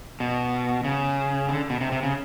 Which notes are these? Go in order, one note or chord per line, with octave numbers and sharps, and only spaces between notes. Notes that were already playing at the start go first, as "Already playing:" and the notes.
B2
C#3
D3
B2
C3
C3
C#3